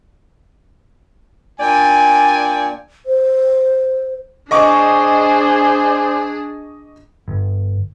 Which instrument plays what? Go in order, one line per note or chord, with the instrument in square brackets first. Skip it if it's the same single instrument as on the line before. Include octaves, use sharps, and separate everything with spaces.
[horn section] A#2 D4 D5 G5 G#5
[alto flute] C5
[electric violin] D4 G#4 [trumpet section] C5 D5 G#5 [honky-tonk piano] D#5 C#6 D6
[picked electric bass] G1